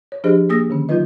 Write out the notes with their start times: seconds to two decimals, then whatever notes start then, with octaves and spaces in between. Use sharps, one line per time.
0.12 C#5
0.24 F3 D4 G4 G#4 C5 D#5
0.49 A#3 G#4 D#6 E6 A#6
0.70 D3 D#3 C#4
0.89 F#3 D#4 F4 B4 D#5